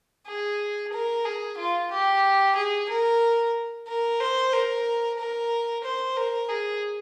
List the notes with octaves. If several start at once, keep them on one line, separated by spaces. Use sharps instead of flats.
G#4
A#4
G#4
F4
G4
G#4
A#4
A#4
C5
A#4
A#4
C5
A#4
G#4